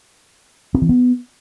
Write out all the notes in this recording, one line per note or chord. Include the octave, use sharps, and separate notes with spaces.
C4
E3
B3